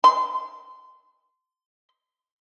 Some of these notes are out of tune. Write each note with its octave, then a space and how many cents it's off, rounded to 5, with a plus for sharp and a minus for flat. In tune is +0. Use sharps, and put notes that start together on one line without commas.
C6 -25